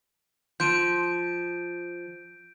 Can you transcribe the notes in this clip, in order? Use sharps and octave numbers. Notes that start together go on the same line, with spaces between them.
F3 G6 D7 D#7